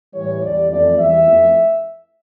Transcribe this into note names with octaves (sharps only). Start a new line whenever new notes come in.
A2 E3 G3 C#5
E2 D3 G3 D5
F2 E3 A3 D5
E2 E3 G3 E5
F2 E3 A3